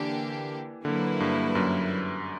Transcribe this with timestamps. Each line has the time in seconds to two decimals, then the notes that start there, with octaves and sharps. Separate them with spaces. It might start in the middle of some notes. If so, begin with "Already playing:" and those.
Already playing: D3 E3 A#3 D4 G4
0.85 D3 F#3 A#3 E4 B4
1.20 G2
1.55 F#2